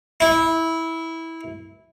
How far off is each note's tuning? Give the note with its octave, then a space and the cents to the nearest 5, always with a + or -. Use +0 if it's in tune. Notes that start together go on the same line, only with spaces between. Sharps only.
E4 -15